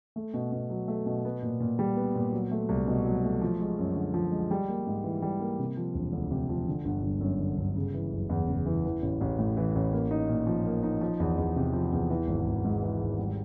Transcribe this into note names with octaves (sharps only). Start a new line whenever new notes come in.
A3
B2
B2
F#3
A3
B2
B3
A#2
A#2
G3
B3
A#2
F#3
A3
C2
B2
F#3
A3
F3
G#3
F#2
D3
F3
G#3
G3
A#3
G#2
E3
G3
A#3
C3
F3
E1
D2
C3
F3
D3
G1
G1
F#2
D3
G1
C#3
E3
F#1
E2
C#3
E3
E3
A1
A1
A2
E3
A1
A#3
D#4
A#2
F3
A#3
D#4
F3
E2
E2
C3
F3
E2
E3
G#1
G#1
G#2
E3
G#1
G3